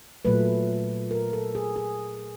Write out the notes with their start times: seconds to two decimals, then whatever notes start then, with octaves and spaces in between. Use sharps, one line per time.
0.25 A#2 F#3 A3 B4
1.11 A#4
1.33 A4
1.55 G#4
1.76 G#4